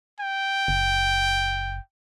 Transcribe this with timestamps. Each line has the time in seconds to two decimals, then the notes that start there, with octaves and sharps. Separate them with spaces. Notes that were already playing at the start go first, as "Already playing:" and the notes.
0.20 G5
0.68 F#1